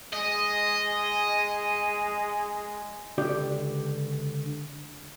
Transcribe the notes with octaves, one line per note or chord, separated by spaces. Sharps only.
G#3 D#5
C#2 D3 G4 D5